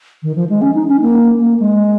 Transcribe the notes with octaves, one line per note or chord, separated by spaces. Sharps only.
D#3
F3
G#3
C#4
D#4
C#4
A#3
A#3
G#3